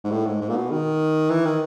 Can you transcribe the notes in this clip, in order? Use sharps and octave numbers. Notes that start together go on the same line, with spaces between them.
G#2
A2
G#2
G#2
A#2
B2
D#3
E3
D#3